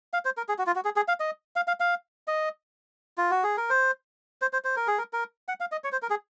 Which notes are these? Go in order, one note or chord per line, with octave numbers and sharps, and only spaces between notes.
F5
C5
A#4
G#4
F#4
F4
F#4
G#4
G#4
F5
D#5
F5
F5
F5
D#5
F4
F#4
G#4
A#4
C5
C5
C5
C5
A#4
G#4
A#4
A#4
F#5
F5
D#5
C#5
C5
A#4
G#4